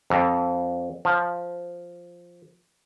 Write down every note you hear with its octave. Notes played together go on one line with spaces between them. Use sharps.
F2
F3